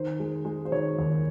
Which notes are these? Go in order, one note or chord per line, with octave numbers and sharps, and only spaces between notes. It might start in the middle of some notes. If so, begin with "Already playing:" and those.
Already playing: D#3 C5
G#3
G#3
C5
D#3 C#5
D#2